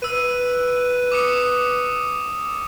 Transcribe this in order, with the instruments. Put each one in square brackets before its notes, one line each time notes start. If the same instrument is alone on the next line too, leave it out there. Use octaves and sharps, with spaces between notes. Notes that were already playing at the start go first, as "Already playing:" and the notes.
[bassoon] B4 [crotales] E6 D#7
[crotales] D6 D#6 C#7